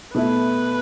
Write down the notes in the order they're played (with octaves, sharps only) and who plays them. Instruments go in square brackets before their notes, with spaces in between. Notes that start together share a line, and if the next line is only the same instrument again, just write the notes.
[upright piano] B2 A3 E4 [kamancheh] B4